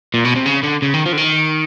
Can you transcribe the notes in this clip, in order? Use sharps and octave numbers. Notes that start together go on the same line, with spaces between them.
A#2
B2
C3
C#3
D3
C#3
D#3
F3
D3
D#3